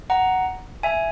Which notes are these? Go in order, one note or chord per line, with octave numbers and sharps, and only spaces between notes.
F#5 A#5
E5 G#5